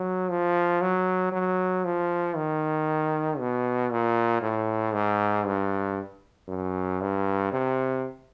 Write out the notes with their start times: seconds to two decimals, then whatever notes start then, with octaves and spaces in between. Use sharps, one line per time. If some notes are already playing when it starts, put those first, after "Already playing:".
Already playing: F#3
0.30 F3
0.81 F#3
1.32 F#3
1.85 F3
2.36 D#3
3.39 B2
3.91 A#2
4.42 A2
4.94 G#2
5.46 G2
6.48 F#2
7.01 G2
7.53 C3